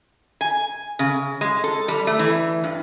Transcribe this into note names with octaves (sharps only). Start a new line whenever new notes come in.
G#5
C#3
G#3
A4
G3
A3
E3
G2